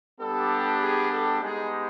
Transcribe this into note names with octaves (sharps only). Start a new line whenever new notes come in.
G3 B3 D4 G4 A4
G#4
A4
G#3 B3 D#4 G4 G#4